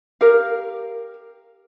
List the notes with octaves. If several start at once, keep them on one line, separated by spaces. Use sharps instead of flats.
G4 A#4 F5